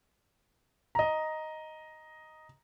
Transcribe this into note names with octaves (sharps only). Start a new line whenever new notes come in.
D#5 A#5